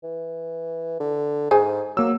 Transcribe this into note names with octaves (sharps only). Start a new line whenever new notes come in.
E3
D3
G#2 G#4 C5 G#5
F#3 A#3 E6